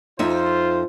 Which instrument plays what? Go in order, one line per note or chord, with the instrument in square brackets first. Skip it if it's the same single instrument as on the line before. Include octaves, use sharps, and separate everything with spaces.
[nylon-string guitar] F2 D#4 E5 [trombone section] F4 C5